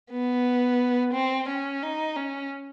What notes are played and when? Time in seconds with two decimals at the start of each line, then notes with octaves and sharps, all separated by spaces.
0.11 B3
1.13 C4
1.48 C#4
1.83 D#4
2.17 C#4